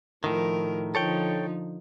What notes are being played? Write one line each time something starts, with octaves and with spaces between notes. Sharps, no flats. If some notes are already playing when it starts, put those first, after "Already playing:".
A2 D#3 F3 A#4
D3 F3 D#4 A4 C#5 G5